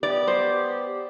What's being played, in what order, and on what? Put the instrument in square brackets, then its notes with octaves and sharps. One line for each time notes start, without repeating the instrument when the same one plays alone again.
[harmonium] B3 G4 [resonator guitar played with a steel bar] D5
[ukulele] C5